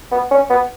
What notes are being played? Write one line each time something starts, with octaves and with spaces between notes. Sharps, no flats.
B3
C#4
B3